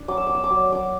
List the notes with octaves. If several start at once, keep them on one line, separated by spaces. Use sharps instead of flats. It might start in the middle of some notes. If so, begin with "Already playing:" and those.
Already playing: D4
F#3 D6
E6
B3 D6
E6
D6
F#3
F#3 D6